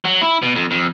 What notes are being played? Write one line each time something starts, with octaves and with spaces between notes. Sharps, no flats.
F#3
E4
B2
F2
F2